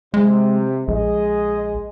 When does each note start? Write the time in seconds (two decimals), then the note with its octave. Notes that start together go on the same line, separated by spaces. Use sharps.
0.14 C3 G#3
0.88 A#1 G#3 G#4 D#5